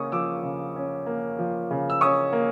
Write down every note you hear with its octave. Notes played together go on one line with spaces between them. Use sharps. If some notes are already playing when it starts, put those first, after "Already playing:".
Already playing: C#3 A#3 C#4 C#6 D#6
F3 D6 E6
C#3
C#4
A#3
F3
C#3
E6
C#4 C#6 D#6
A#3